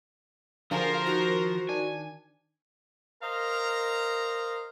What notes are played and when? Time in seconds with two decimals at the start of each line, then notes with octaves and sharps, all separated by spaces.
0.71 D3 F3 F#4 G#4 A#4 C5 F5
1.06 D#3 F#4
1.69 D#3 D4 G#5 G#6
3.22 A#4 C5 D#5 F5 A#5